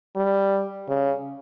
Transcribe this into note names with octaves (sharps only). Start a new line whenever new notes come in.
G3
C#3